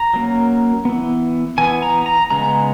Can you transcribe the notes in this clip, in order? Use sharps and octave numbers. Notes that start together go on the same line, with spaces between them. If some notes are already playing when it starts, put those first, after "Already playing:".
Already playing: A#5
F#3 A#3 C#4
E3 B3
E3 B3 G#5
A#5
A#5
C#3 G#3 B3 A#5